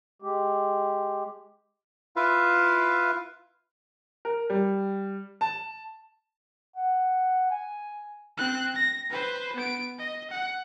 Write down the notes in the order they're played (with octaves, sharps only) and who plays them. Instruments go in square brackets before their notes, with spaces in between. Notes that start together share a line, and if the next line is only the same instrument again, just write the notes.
[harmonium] G#3 G4
[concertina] E4 F4 B4 E5 F5
[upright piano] A#4
G3
A5
[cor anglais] F#5
G#5
[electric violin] C4 F#6
A#6
B4 C5
B3 D7
D#5
F#5